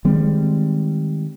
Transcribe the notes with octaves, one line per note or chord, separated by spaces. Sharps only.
D#3 G3 G#3 C4